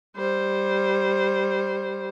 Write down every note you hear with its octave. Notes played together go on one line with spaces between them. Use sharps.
G3 C5